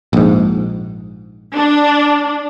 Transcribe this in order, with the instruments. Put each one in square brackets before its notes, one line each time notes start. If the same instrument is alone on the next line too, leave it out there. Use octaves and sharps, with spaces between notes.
[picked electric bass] A#1 G#2
[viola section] D4